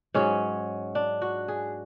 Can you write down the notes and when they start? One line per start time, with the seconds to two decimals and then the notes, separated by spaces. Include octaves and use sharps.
0.14 G#2 F#3 C#4
0.95 D4
1.22 F#4
1.48 G#4